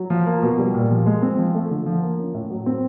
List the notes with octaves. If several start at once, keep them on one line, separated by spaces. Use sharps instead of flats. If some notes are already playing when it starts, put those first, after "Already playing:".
Already playing: F#3
F3
A#3
B2
G3
A#2
F3
G#3
C4
F3
A3
D3
F3
A#3
C#4
A2
F#3
C4